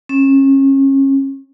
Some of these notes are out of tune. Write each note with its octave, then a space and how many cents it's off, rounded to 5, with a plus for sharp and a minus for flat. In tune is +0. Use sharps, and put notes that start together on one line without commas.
C#4 -30